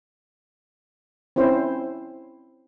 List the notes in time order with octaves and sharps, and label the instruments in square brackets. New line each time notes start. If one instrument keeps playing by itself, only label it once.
[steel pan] C4 C#4 E4 C5